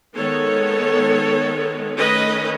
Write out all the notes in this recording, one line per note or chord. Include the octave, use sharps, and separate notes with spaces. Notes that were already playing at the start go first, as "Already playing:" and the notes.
D#3 G#3 B3 A4 C#5
D#3 A3 C#4 B4 D#5